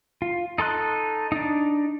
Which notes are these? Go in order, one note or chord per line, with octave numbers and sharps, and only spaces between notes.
F4
D#4 A4 C6 F#6
D4 D#4